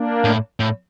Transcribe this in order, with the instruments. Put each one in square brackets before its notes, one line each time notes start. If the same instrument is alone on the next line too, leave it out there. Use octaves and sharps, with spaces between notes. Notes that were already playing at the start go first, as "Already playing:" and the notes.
Already playing: [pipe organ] A#3 D4
[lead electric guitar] A2
A2